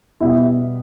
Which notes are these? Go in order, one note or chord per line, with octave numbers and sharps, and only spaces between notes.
B2 G3 B3 E4